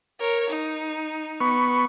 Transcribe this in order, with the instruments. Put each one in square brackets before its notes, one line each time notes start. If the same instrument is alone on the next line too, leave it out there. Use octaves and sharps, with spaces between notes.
[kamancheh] A#4 C#5
D#4
[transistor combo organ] B3 C#6